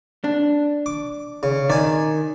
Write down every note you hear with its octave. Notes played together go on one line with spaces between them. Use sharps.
D4
D6
C#3
D#3 D5 G#5